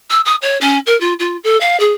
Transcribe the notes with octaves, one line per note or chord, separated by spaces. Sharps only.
E6
D#6
C#5
C#4
A#4
F4
F4
A4
F5
G#4